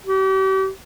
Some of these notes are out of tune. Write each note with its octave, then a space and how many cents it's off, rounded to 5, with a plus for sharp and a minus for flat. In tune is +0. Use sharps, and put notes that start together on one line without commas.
G4 -40